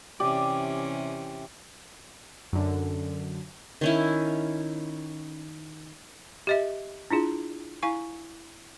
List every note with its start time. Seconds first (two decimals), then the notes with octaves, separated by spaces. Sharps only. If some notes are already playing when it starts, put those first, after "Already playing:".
0.20 C3 E3 C#4 G4 D5
2.53 F#2 D3
3.81 D#3 C#4 E4
6.47 G4 D#5 E5
7.11 D4 E4 F4 G#4
7.83 E4 F5 G#5 C#6